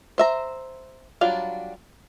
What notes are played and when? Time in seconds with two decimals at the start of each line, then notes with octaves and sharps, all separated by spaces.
0.18 C5 E5 A#5
1.21 F#3 G3 D4 F4 F5